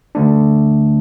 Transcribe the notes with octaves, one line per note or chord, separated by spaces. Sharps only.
D2 D3 A3 D4